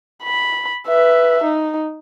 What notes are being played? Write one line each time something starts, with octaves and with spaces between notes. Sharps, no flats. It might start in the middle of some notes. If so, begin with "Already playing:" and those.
B5
B4 E5
D#4